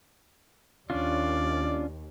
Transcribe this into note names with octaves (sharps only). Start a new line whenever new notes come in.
D#2 C#4 D4 F4 D5